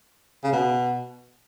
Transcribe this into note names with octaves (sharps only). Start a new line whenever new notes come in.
C#3
B2